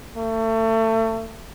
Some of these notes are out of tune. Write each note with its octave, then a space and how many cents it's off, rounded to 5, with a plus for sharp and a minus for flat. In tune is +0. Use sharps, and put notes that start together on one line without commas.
A3 +30